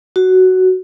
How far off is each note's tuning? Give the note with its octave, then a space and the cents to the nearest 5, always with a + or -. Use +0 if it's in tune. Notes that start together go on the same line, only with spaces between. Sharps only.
F#4 +5